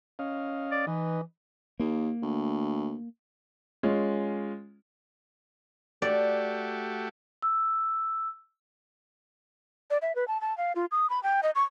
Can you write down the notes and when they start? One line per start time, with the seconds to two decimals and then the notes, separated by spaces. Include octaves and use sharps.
0.19 C#4 D#5 F5
0.72 D5
0.87 E3 D#4 B4 D#5
1.80 D#2 A#3
2.22 D2
3.83 G#3 C#4 F4
6.02 A3 F#4 G4 D5
7.42 E6
9.90 D5
10.02 E5
10.16 B4
10.28 A5
10.41 A5
10.58 F5
10.75 F4
10.91 D#6
11.10 B5
11.23 G5
11.43 D#5
11.55 C#6